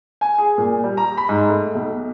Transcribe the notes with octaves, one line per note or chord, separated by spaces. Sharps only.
G#5
G#4
A#2
G3
A#5
B5
G#2
A3
B1